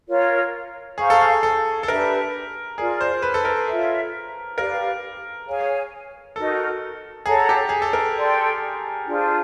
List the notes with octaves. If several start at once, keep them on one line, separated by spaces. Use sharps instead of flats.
F4 A#4 C#5
G#4 C5 F5 A#5 C#6
A4
G#4
A4
A4
D4 G4 A#4 B4 E5
F4 G#4 A#4 D5
C5
B4
A4
A#4
F4 A4 C#5 E5
G4 A#4 B4 D5 F5
G#4 C#5 F5 G#5
D#4 F#4 A4 A#4
G#4 A4 C#5 F#5 A#5
G4
G#4
A4
A#4
A4 D5 G5 C6
D4 F4 G#4 C5